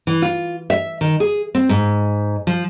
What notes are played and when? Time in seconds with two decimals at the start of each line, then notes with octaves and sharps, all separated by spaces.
0.07 E3
0.22 F4
0.70 E5
1.01 D#3
1.20 G#4
1.55 C4
1.69 G#2
2.47 F3